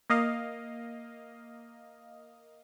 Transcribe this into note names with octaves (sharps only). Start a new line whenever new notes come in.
A#3 D#5 F5